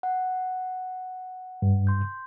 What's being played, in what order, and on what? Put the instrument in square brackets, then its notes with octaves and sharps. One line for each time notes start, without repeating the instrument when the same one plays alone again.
[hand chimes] F#5
[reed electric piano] G2
[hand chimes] C6 G6